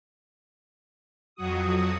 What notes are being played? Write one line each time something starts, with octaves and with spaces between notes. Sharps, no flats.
F2 F#3 F#4 D#6